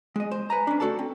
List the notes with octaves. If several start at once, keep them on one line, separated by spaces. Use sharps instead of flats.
G#3 D#5
C5
B4 G#5 A#5
C#4 D4
A3 C4 F#4 A4 D5 A5
C4